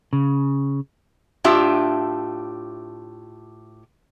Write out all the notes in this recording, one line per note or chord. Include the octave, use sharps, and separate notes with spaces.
C#3
A2 D4 F4 G4 E5